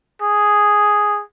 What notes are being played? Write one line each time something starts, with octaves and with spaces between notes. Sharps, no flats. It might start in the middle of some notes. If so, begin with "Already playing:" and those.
G#4